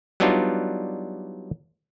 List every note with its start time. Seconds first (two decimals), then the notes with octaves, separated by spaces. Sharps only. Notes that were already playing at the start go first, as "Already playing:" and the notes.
0.20 F#3 G3 B3 D4 D#4 F4